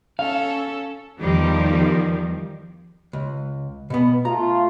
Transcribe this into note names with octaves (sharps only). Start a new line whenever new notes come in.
C#4 A4 F5
E2 D#3 F3 G3
C#2
B2 B3
A3 F4 A#5